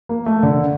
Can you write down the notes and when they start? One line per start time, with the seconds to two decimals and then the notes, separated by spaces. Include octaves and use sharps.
0.09 A#3
0.26 A3
0.43 D3